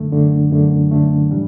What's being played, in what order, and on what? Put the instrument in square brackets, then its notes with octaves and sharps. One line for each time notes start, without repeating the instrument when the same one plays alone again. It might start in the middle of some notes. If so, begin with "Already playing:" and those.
Already playing: [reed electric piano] F#2 D3 A3
F#2 D3 A3
F#2 D3 A3
F#2 D3 A3
A2 E3 G3 D4